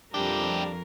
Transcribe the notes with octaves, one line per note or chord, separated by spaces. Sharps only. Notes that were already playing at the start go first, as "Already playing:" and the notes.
F2 F3 G3 A3 D4 G4 A#4